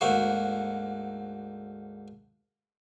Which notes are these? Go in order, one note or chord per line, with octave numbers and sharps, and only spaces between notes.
D2 G#2 A#3 F#4